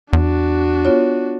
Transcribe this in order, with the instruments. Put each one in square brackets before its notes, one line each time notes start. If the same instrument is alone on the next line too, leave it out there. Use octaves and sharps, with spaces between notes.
[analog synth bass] E2 [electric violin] D4 F#4
[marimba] B3 F4 C#5